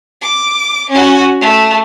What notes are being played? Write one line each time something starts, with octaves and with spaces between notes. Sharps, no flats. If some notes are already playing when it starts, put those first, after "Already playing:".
D6
C#4 F#4
A3